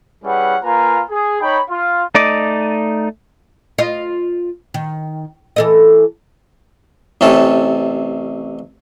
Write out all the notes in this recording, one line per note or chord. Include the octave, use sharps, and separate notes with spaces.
G3 C#4 E4 G#4 B4 F#5
A#3 F4 B4 G#5 A#5
G#4
D#4 C#5 G5 B5
F4
A3 D#4 D5 D#5 D6
F4 D#5
D#3
E3 A4 D#5
A1 C3 C#4 A4